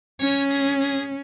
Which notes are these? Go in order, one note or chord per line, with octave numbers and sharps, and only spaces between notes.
C#4 C#5
G#4
G#4